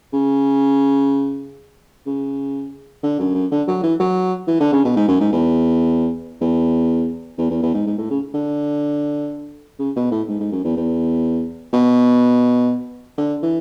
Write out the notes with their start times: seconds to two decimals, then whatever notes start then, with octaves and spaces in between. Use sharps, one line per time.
0.13 C#3
2.07 C#3
3.03 D3
3.20 F#2
3.35 F#2
3.52 D3
3.68 F#3
3.83 E3
4.00 F#3
4.48 E3
4.60 D3
4.73 C#3
4.85 B2
4.96 G#2
5.08 F#2
5.21 G#2
5.33 E2
6.41 E2
7.38 E2
7.50 E2
7.63 E2
7.74 G#2
7.87 G#2
7.98 A2
8.11 C#3
8.34 D3
9.79 C#3
9.96 B2
10.11 A2
10.28 G#2
10.40 G#2
10.52 F#2
10.64 E2
10.77 E2
11.73 B2
13.18 D3
13.43 E3